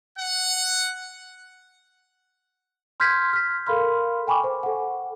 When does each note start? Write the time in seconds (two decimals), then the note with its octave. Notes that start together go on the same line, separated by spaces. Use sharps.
0.18 F#5
3.00 C6 F6 G6 G#6 B6
3.33 F6 B6
3.66 A4 A#4 F5 B5 C6 F6
4.27 G5 G#5 B5 C#6 D6
4.44 C5
4.63 A4 F#5